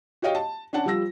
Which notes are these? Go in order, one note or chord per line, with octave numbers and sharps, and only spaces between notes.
F#4 G4 C#5 D#5 F5 G5
A5
C#4 D4 F#5 A5
F3 G3 F4 E6 A#6